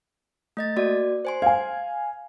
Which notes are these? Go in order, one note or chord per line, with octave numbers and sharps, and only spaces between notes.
A3 D#5 A6
A#3 F#4 D5
C5 G#5 C6
F5 G#5 G#6